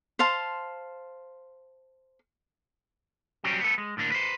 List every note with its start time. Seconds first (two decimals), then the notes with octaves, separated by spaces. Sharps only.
0.19 C5 F5 A5 C6
3.44 F#3 G3 C4 C#4 G4
3.61 B3 A4
3.78 G#3
3.97 A2 D3 A#3 D4
4.12 B4 C5